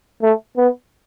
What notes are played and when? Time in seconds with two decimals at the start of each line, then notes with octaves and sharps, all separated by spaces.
0.22 A3
0.57 B3